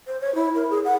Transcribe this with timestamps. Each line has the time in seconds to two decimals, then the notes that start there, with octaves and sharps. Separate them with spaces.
0.07 C5
0.21 C#5
0.35 E4
0.55 A#4
0.70 G#4
0.85 F#5